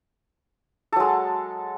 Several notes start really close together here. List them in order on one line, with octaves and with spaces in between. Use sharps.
A4 F#3 G#3